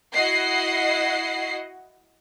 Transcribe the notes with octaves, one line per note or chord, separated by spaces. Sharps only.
E4 F#4 D#5 F#5 C7